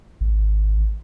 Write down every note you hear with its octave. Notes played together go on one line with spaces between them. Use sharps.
G#1